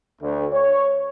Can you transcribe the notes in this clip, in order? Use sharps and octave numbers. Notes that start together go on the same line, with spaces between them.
D2
C#5